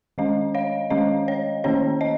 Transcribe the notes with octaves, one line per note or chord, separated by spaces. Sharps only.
D#3 G#3 C#4 D#5
C#5 F5
D#3 G#3 C#4 D#5
C#5
D#3 A#3 C#4 C#5
D#5